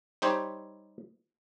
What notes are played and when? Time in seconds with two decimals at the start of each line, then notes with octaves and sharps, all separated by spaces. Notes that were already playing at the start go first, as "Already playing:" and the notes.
0.22 G3 C4 D#4 G4 C5 C#5